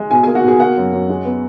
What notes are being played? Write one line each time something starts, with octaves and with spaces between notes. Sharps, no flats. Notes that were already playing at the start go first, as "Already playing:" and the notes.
Already playing: G#3
B2 G#4 G#5
A#3 G#4 G#5
F#4 F#5
B2 G#4 G#5
A#3 F#4 F#5
F#2
F#2
G#3
B3